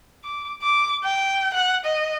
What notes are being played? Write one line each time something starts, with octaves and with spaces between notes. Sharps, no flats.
D6
D6
G5
F#5
D#5